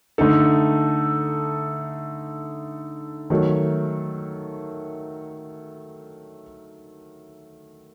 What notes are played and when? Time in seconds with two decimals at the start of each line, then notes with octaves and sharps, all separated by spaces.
0.18 D3 A3 D#4 A4
3.30 D#3 F#3 A3